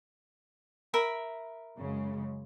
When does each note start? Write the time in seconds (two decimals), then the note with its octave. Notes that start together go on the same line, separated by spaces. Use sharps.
0.94 A#4 E5 B5
1.78 F#2 C#3 G#3